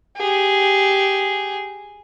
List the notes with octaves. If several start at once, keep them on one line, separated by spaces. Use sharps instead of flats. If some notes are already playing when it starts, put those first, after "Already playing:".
G4 G#4